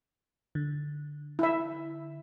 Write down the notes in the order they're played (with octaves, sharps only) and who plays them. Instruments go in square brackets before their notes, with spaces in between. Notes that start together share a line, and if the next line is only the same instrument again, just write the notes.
[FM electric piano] D3
[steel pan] E4 E5